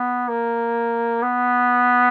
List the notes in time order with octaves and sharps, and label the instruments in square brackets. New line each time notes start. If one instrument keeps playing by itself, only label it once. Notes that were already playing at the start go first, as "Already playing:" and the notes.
Already playing: [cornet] B3
A#3
B3